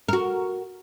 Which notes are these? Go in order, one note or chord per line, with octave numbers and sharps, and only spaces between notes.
F#4 A#4